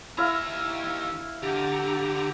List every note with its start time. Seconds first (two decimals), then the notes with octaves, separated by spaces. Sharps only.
0.18 D#2 E4 E5 F5 A#5
1.43 D3 G4 A#5